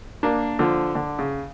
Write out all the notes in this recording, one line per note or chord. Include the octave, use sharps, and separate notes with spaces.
A#3 D4
D3 F3
D3
C#3